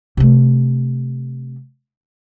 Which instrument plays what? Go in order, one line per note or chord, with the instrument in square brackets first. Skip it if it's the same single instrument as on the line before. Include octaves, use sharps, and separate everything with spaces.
[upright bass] C3 A3